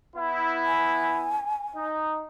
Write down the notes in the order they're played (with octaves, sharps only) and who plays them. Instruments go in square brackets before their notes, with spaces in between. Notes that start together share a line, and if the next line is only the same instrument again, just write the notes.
[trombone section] B3 E4
[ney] G#5
[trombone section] D#4